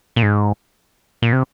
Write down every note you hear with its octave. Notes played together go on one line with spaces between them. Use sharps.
A#2
G#2
A#2
C3